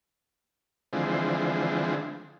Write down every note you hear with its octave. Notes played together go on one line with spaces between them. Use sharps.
D3 E3 F3 G#3 C4